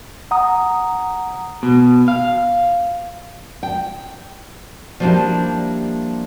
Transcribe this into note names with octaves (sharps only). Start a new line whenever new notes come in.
F#5 A#5 D#6
B2
F5
G5
F3 G3 A#3 D4 E4 G4